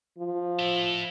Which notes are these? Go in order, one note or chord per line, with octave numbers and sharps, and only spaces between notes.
F3
E4 A4